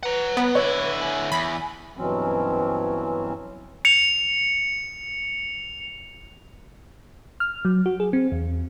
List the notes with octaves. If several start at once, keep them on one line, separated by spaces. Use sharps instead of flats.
B4 F#5 A#5
B3
D3 E4 C#5
G#5
E2 B5
G2 B2 E3 F#3 C4 C#4
C#7 F7
F6
F#3
F#4
G#4
C4
E2